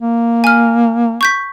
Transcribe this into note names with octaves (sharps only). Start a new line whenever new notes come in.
A#3
G#5 F6
C#6 G6 B6